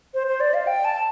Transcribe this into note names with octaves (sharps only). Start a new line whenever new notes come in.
C5
C5
D5
F5
G5
A5